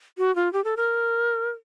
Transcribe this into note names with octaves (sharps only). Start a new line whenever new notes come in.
F#4
F4
G4
A4
A#4